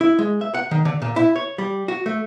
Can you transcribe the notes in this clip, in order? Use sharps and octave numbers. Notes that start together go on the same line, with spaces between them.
E4
G#3
E5
F#5
D#3
D3
A#2
E4
C#5
G3
F#4
A3